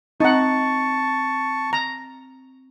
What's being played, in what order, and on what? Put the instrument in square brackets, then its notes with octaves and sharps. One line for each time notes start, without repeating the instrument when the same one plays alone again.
[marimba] C4 [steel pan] D#4 F#5 [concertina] A5 C#6
[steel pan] A#5